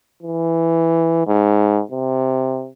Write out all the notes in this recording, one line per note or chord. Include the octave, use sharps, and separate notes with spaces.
E3
G#2
C3